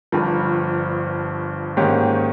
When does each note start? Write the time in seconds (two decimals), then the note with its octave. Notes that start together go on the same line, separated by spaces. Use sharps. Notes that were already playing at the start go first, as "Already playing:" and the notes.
0.12 G1 G2 F3
1.77 G#2 D#3 A#3 C#4 G4